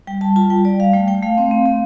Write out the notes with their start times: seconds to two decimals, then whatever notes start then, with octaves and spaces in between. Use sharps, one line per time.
0.07 G3 G5
0.21 G3 A5
0.36 F4 A5
0.50 G3 G5
0.65 G3 D5
0.80 G3 F5
0.93 A3 G5
1.08 A3 G5
1.23 A3 F5
1.38 C4
1.51 C4
1.66 C4